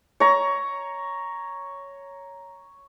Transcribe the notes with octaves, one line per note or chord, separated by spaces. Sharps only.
C#5 A#5